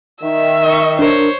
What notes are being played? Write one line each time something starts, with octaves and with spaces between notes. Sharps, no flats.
D#3 E5
D#5 C#6
D4 A#4 C5 C#5